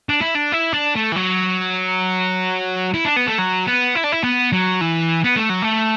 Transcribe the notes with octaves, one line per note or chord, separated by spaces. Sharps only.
D4
E4
D4
E4
D4
A3
E3
F#3
E4
D4
B3
A3
F#3
B3
E4
D4
E4
B3
F#3
E3
B3
A3
F#3
A3